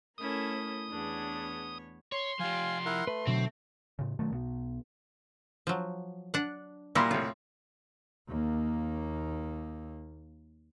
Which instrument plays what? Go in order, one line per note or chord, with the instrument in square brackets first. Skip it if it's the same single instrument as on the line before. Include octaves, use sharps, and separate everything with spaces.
[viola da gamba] A3 E4 A4 [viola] C#4 A#4 [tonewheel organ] D#6
[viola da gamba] E2 B3 C#5 [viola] D4 G#4
[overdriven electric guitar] C#5 [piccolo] C6
[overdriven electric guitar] F3 G4 [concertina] F4 G#5
[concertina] E4 A#4 F#5
[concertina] A3 [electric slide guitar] B4
[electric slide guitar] B2 D3 F#3 [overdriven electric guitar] C4
[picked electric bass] A2 C#3
B2 D#3 F#3 A3
B1 B2
[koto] F3 F#3
D4 F#5
[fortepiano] A#2 A#3 C6 [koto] G3 E4
[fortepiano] C2 A2 [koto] F4
[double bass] D#2 A#3